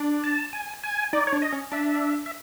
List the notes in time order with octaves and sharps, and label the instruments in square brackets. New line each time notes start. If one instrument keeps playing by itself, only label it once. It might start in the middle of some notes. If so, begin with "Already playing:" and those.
Already playing: [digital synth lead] D4
[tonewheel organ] A5
G#5
G#5
[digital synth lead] D#4 [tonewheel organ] D5
[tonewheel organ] C#5
[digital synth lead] D4
[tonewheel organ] D#5
[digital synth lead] C#4
[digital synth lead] D4 [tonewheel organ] E5
[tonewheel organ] E5